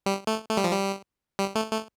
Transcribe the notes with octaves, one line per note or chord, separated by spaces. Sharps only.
G3
A3
A3
G3
F3
G3
G3
A3
A3